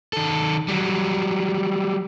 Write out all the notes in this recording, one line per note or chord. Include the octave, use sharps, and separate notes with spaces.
D#3 A4
F#3 G3